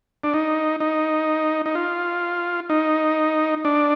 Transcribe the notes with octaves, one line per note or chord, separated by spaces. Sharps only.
D4
D#4
D#4
D#4
F4
D#4
D4